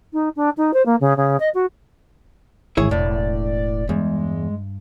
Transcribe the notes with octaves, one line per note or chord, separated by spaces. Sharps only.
D#4
D4
D#4
C5
A#3
C#3
C#3
D#5
F#4
G#1 E2 D#3 E4 G#4 C#5
E1 A2 D5
E2 G2 G#3